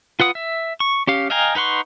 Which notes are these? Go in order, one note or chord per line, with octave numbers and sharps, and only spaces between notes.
F4 B4 F#5 D#6
E5
C#6
C#4 G4 F5
D#5 F5 G5 G#5 A#5
D#4 B4 F#5 C6 C#6